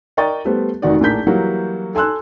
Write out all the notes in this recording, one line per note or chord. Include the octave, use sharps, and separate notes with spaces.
A#4 D5 D#5 G5 C#6 A6
G3 A3 B3 C5
F1 D#3 F#4 D5
A#1 A2 D4 A#4 G6 B6
E3 F#3 G3 A#3 E4 F#4
A4 G#5 C6 E6 F#6